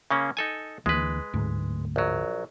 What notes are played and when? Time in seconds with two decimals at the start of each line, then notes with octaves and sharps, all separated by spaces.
0.11 C#3 A#3 C#4
0.37 D#4 A4 G#5
0.86 D2 E3 G#3 A#3 B4
1.33 D1 D2 G#2
1.96 A#1 F#3